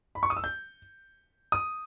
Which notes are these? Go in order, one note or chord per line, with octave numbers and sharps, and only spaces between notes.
B5
C#6
D#6
E6
G6
D#6